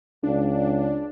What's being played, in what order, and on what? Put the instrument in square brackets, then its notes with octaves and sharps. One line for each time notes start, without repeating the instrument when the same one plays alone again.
[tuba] C#2 [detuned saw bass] D4